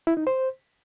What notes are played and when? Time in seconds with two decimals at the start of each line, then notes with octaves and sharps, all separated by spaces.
0.07 E4
0.17 D#4
0.27 C5